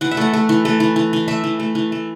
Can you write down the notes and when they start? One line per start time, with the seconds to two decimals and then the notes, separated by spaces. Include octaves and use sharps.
0.01 E3 F#5
0.11 E5
0.17 A3 F#5
0.33 A3
0.49 E3
0.65 A3
0.80 E3
0.96 E3
1.13 E3
1.28 A3 E5
1.44 E3
1.60 A3
1.75 E3
1.92 A3